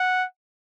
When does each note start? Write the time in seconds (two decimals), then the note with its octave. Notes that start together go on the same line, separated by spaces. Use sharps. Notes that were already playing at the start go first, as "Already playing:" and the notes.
Already playing: F#5